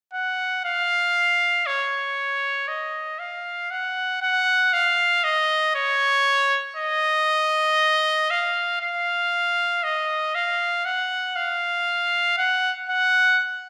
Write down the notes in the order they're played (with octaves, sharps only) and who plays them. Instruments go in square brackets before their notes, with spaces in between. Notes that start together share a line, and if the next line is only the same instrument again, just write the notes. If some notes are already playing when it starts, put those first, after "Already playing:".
[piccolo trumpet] F#5
F5
C#5
D#5
F5
F#5
F#5
F5
D#5
C#5
D#5
F5
F5
D#5
F5
F#5
F5
F#5
F#5